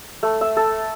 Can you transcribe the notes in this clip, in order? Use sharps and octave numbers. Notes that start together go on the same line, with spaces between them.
A3
E5
A4